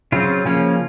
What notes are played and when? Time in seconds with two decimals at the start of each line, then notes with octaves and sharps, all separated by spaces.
0.12 C#3 F#3 C4 F4
0.46 C#3 F3 A#3 C#4